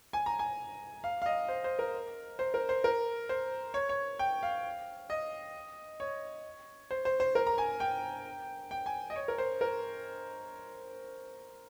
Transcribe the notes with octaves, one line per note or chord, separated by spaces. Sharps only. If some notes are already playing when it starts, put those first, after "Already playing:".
G#5
A#5
G#5
F5
F5
D#5
C5
C5
A#4
C5
A#4
C5
A#4
C5
C#5
C#5
G5
F5
D#5
C#5
C5
C5
C5
A#4
A#5
G#5
G5
G5
G#5
D#5
C#5
A#4
C5
A#4